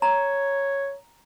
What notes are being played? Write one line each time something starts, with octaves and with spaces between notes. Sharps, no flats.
C#5 A#5